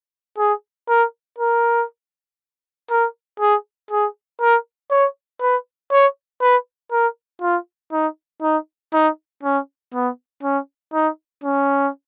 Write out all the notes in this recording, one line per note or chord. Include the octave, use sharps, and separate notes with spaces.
G#4
A#4
A#4
A#4
G#4
G#4
A#4
C#5
B4
C#5
B4
A#4
F4
D#4
D#4
D#4
C#4
B3
C#4
D#4
C#4